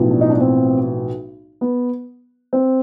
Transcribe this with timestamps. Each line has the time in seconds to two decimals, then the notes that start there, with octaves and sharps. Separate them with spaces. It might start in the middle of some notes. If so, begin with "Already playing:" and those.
Already playing: B1 A2 F3
0.11 D4
0.21 D#4
0.30 D4
0.41 C4
1.61 B3
2.53 C4